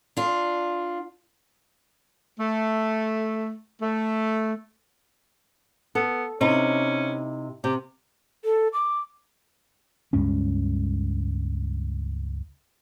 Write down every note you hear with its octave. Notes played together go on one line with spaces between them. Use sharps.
D4 F4
A3
A3
B3 A4
C3 C#4 D#4 E4
C3 G4
A4
D6
C#2 G2 G#3 C#4